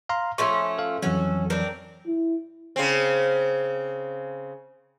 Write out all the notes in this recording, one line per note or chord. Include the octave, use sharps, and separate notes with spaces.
F5 A#5 C6
F3 A3 C#4 E5 C#6
A4 F5
F2 E3 F#3 C#4 F#4 A4
C4 D4 A#4
E4
C#3 C4